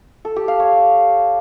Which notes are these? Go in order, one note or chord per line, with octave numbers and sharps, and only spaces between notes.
A4
G4
F5
C#5